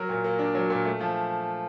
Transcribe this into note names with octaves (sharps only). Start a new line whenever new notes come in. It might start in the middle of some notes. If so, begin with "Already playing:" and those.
Already playing: F#3 A#4
A#2
A#3
D4
F#3
A#2
A3
F3